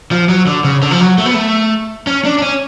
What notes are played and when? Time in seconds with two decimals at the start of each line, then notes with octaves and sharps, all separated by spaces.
0.11 F3
0.29 F#3
0.47 D3
0.64 C#3
0.82 D3
0.91 F3
1.00 F#3
1.18 A3
1.26 B3
1.34 A3
2.07 C#4
2.25 D4
2.38 D4
2.42 C#4